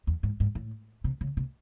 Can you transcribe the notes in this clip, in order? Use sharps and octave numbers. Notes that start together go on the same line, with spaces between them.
E2
G#2
G#2
A2
C3
C#3
C3